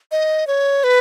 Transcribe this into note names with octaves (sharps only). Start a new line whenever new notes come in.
D#5
C#5
B4